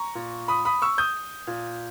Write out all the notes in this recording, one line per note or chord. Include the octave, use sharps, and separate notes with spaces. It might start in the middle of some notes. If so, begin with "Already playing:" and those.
Already playing: A#5 C#6
A#2
B5 D#6
B5 D#6
C#6 E6
D#6 G6
A#2